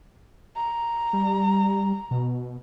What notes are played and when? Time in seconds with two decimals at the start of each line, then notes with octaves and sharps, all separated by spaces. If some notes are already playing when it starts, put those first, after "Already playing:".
0.56 A#5
1.13 G3
2.11 B2